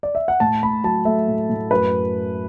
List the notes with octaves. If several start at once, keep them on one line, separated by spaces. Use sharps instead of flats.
D5
E5
F#5
A2 A5
A2 B5
F#3 A5
A3 E5
A2
A2
F#2 B4